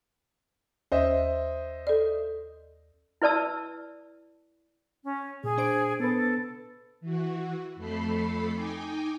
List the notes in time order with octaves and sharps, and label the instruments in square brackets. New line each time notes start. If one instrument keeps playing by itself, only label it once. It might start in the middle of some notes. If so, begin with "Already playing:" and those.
[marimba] D#2 [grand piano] C5 D#5 E5
[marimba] A4 D5
[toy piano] E4 B4 D5 A5 E6
[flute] C#4
[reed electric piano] A#2 [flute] G#4
[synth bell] D4 C5 D7
[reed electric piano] B3 B4 [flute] A4
[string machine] E3 F#4
F2 A3 A4 B5 C7
D#4 G5 G#5 D6